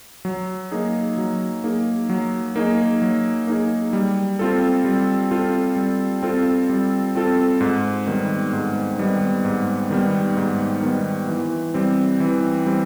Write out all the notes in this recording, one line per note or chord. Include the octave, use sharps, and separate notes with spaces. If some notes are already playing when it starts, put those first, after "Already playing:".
F#3
A#3 D#4 G#4
F#3
A#3 D#4 G#4
F#3
A#3 D#4 G#4
F#3
A#3 D#4 G#4
G3
C4 F4 A4
G3
C4 F4 A4
G3
C4 F4 A4
G3
C4 F4 A4
G#2
D#3 G3 B3
G#2
D#3 G3 B3
G#2
D#3 G3 B3
G#2
D#3 G3 B3
E3
G3 C4
E3
G3 C4